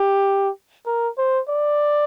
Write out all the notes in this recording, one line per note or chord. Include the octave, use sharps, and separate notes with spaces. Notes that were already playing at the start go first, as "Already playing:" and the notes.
Already playing: G4
A#4
C5
D5